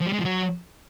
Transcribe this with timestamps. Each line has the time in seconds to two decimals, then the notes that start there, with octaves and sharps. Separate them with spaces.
0.01 F3
0.07 G3
0.13 G#3
0.19 F3
0.25 F#3